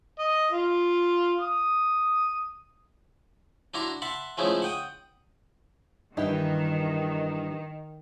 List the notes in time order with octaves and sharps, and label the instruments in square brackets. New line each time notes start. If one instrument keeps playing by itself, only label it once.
[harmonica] D#5
F4
D#6
[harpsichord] D4 E4 F#4 A#5 C6
E5 F#5 A5 B5 C6
F3 G#3 A3 C#4 D#4 E4
F#5 G5 D#6
[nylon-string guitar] G2 E3 [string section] D#3 [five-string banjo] D#4 E4 G4